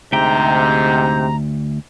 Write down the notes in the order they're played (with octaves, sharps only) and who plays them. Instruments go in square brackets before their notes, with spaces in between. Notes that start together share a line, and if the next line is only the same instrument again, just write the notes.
[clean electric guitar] D2 E5 G5 [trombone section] G#2 C3 [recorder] A#5 [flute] G6